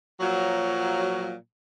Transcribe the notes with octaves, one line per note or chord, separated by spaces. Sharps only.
A#2 F3 F#3